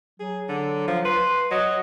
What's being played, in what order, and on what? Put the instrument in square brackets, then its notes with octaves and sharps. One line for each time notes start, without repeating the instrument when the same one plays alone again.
[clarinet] F#3 [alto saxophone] G#4
[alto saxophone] D3
F3
[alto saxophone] B4 [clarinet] C6
[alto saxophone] F#3 [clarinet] D#5